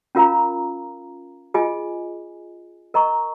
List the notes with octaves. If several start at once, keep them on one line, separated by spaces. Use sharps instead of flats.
C#4 F4 A#4 F5 A#5
F4 G#4 D#5 G#5
A#4 D#5 A#5 C#6